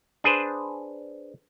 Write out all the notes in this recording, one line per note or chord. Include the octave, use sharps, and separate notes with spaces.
D4 G#4 B4 C5